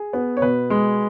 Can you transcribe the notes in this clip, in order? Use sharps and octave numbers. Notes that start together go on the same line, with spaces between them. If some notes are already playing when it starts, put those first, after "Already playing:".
Already playing: G#4
B3
C#5
B2 B4
G#3